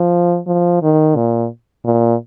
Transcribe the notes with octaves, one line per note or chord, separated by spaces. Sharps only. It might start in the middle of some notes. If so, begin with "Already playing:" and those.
Already playing: F3
F3
D#3
A#2
A#2